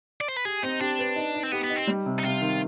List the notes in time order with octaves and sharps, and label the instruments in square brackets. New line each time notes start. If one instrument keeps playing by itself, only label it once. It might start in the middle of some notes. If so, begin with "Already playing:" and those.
[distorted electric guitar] D5
C5
B4
[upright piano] G4 [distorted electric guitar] G#4
[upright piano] C4 [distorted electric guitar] D#4
[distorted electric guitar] D4 [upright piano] G4
[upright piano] B4
D#4
D#4
[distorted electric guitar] C4
[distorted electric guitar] B3 [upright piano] G4
[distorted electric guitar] B3
[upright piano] D#4
[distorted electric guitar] C4
[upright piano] G3
C3
[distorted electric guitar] D#4
[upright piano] C3 [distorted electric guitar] F4
[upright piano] D#3